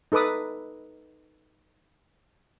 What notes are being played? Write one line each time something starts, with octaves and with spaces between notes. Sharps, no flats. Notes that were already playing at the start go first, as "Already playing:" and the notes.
D#4 A4 B4 D6 D#6